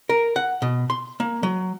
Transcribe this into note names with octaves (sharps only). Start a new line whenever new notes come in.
A#4
F#5
B2
C6
A#3
F#3